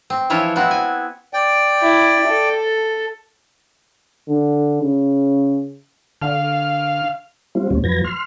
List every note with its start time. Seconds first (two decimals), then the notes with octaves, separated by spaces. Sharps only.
0.10 C4
0.30 E3 F3 E4 F4 C#5
0.56 B3 C4 E4 F#4
0.71 G#5
1.34 D5 G5
1.82 E4
2.27 A4
4.29 D3
4.83 C#3
6.22 D3 F5
7.55 G3 C4 F4
7.70 D2 A#2 G3 C4 C#4
7.84 F2 F3 F#3 B4 G#6 A#6
8.04 C6 F6